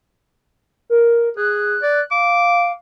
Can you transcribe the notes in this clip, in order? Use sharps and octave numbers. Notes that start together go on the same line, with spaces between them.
A#4
G#4 F#6
D5
F5 D6